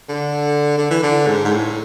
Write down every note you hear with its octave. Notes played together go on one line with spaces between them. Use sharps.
D3
D3
E3
D3
G#2
G#2
A2